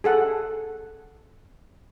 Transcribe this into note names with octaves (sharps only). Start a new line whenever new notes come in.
G#4 A4 F#5